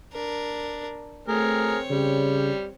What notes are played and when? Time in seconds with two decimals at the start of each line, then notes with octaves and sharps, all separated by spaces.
0.13 D4 A#4
1.28 A3 C4 G#4 A#4 C#5
1.90 C#3 G3